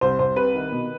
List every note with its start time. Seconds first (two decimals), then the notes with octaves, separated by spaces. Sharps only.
0.01 C2 C5
0.19 C2 C5
0.36 C3 B4
0.55 D#3
0.72 B2